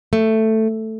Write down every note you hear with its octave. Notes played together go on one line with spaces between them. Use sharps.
A3